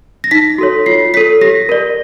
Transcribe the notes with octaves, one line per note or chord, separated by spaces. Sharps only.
A#6
D#4 B6
F#4 A4 C#5
F4 C7
A4 C#5 B6
G4 A#6
A#4 D5